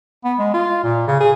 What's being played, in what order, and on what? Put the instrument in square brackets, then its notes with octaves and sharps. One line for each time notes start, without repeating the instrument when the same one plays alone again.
[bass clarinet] B3
G#3
F4
A#2
C#3
G#4